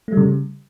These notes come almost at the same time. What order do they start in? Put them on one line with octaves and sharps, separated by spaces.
A3 G3 C#3